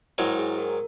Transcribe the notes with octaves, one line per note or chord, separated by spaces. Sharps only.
G#2 D#3 F#3 E4
G#4
A#4